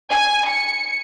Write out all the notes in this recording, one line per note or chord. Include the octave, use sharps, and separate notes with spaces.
G#5
C#7